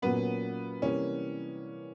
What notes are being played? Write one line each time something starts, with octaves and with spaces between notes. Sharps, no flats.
A#2 F#3 A#3 B3 C#4
C3 E3 G3 A#3 C#4